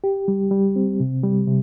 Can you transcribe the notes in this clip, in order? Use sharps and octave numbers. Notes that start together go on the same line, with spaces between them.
G4
G3
G3
C4
C3
G3
C3